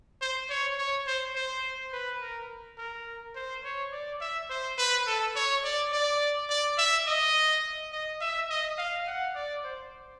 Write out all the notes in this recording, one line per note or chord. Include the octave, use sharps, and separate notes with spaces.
C5
C#5
C#5
C5
C5
B4
A#4
A#4
C5
C#5
D5
E5
C5
B4
A4
C#5
D5
D5
D5
E5
D#5
D#5
E5
D#5
F5
F#5
D5
C5